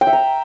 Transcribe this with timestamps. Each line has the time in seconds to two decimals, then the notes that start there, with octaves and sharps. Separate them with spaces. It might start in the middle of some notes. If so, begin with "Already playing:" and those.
0.01 G5
0.07 E5
0.13 A#5